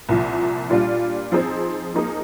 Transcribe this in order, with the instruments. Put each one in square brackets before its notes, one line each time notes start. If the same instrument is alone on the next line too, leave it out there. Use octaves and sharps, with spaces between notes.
[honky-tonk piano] C2 A#2 F3
A#2 G3 D4 F4
F3 C4 D#4 G#4 C5
F3 A#3 D#4 G#4